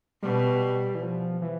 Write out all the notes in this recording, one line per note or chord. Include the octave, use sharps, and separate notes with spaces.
B2 G3
E3
F3
E3